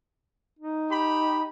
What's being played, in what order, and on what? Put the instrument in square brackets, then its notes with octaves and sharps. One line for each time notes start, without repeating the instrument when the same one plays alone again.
[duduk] D#4
[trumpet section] G4 B5